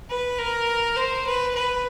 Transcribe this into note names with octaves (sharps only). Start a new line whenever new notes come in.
B4
A#4
C5
B4
B4